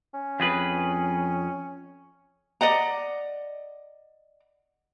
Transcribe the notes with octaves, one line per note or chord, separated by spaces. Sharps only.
C#4
F2 G#4 B4
D5 D#5 F#5 A#5